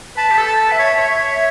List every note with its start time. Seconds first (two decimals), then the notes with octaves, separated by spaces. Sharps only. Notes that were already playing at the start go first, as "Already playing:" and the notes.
0.17 B4 A5
0.31 G4
0.37 A4
0.45 A5
0.69 B4 E5
0.79 C#5
0.99 C#5